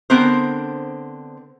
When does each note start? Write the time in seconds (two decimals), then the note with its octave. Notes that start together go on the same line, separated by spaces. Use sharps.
0.10 D3 B3 C4 A#4 C5